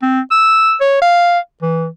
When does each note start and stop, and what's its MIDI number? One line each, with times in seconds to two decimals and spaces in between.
0.02 0.20 60
0.31 0.75 88
0.81 1.00 73
1.02 1.39 77
1.62 1.87 52